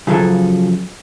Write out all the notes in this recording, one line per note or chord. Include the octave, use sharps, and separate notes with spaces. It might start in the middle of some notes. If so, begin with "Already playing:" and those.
C#3 F3 F#3 A4 G#5